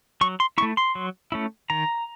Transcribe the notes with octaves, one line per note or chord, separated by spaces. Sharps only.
F#3 C#6
C6
A3 C#4 E4 C#6
C6
F#3
A3 C#4 E4
D#3 A#5